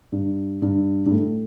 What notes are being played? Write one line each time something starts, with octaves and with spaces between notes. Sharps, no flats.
G2
G2
G2
A2